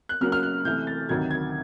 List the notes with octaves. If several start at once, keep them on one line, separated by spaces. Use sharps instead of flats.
F#6
C#3 F#3 A#3 F6
F6
F#6
C3 E3 A3 G6
A6
D2 C3 D#3 F#3 G#6
G#6